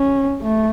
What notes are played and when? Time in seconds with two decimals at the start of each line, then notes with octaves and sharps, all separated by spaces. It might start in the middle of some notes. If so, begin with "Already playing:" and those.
Already playing: C#4
0.42 A3